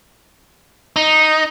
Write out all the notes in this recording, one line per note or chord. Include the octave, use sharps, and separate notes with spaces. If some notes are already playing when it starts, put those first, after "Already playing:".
D#4